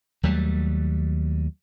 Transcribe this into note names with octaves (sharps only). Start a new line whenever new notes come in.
D#2 F#3 G3 A3